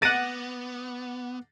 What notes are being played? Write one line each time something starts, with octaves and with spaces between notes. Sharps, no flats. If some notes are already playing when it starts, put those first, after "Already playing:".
B3 F#5 D6 A6 A#6 D#7